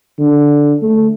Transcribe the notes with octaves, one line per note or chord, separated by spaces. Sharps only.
D3
A3